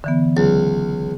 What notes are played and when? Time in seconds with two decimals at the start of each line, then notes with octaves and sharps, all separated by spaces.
0.04 D3 E3 B3
0.37 C#2 F#3